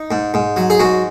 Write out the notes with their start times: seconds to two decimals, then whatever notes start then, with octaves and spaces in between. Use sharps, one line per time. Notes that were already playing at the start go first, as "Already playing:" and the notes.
Already playing: D#4
0.11 G#2
0.34 G#2
0.56 F#3
0.70 G#4
0.80 G#2 F#4